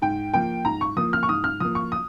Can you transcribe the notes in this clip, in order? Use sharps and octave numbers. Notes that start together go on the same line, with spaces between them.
G#2 G5
F3 A#3 G5
G#2 A#5
C#6
F3 A#3 D#6
F6
C#6
G#2 D#6
F6
F3 A#3 D#6
C#6
D#6